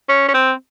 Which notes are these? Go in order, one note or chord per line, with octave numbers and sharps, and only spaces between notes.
C#4
C#4
C4